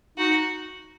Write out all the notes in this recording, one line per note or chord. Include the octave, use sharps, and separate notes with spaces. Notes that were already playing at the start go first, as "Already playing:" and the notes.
D#4 F#4